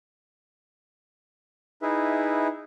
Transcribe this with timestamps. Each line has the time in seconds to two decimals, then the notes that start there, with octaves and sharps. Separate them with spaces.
1.82 D#4 E4 G#4 B4 E5